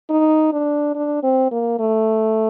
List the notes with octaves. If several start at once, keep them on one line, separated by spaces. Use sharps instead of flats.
D#4
D4
D4
C4
A#3
A3